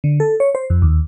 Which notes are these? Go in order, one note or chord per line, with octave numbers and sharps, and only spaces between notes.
D3
A4
C#5
C5
F2
D#2